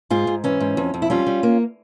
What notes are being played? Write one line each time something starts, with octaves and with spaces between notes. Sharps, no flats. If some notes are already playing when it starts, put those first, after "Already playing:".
G#2 F4 G#4
G#2
E3 C#4
G#2
F2
F2
E4
G3 C#4 F4
G3
A#3